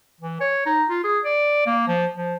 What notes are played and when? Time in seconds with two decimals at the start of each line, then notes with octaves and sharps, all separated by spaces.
0.21 E3
0.41 C#5
0.66 D#4
0.89 F4
1.04 G#4
1.25 D5
1.66 A#3
1.88 F3
2.17 F3